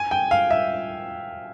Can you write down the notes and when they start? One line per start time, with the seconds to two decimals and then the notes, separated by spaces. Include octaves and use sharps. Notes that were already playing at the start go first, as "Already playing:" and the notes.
Already playing: G#5
0.11 G5
0.31 F5
0.51 E5